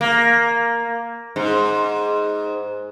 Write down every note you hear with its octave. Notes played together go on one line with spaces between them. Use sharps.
A#3
G#2